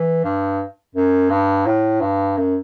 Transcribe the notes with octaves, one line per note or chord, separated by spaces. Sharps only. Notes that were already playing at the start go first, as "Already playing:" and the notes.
Already playing: E3
G2
F#2
G2
A2
G2
F#2